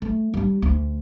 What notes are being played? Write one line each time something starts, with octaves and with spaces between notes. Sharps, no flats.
A3
G3 D4
D2